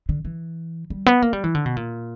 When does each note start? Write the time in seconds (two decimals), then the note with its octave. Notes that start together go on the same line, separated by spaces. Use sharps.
0.09 D3
0.25 E3
0.90 G3
1.06 B3
1.22 A#3
1.33 G3
1.44 E3
1.55 D3
1.66 B2
1.77 A#2